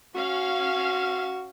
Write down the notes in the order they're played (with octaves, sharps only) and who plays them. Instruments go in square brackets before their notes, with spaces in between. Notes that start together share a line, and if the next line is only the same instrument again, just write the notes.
[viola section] C#4 F5 [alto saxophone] F#4